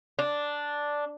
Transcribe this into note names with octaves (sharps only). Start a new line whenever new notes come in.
D4